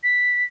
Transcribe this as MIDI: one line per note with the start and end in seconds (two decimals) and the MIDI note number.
0.03 0.44 95